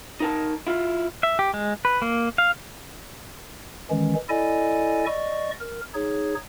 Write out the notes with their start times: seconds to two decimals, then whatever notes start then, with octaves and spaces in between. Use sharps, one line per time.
0.20 D#4 A#4 A5
0.67 E4 F4
1.23 E5
1.39 G4
1.54 G#3
1.85 B4
2.02 A#3
2.38 F5
3.90 D#3 E3 G#3 C#4
4.29 E4 A4 D5 D#5 G#5
5.06 D5 D#5 C#6
5.60 A#4
5.94 D#4 G#4 C#5